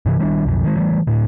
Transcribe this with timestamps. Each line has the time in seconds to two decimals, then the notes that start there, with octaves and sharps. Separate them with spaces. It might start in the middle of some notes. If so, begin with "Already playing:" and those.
0.06 G2 C3 D#3 E3
0.19 D#3 G3 G#3 D4
0.45 B1 F2
0.64 D#3 G#3
0.77 E3 G3 A3
1.07 D2 A2